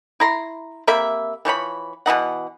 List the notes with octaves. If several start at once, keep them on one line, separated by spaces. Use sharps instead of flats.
E4 A#5 C6
C3 A#3 E5 B5
E3 F3 C#5 B5
B2 E3 D#4 F#5